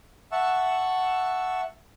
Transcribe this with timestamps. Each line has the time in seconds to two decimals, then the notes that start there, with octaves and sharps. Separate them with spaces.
0.32 E5 F#5 A5 C#6 E6